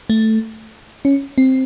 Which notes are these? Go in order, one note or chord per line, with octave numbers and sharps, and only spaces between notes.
A3
C#4
C4